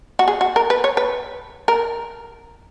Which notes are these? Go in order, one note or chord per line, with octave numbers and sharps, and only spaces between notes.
F#4
G#4
F#4
A#4
B4
C#5
B4
A#4